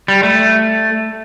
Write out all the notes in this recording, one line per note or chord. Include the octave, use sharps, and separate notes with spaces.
G3
A3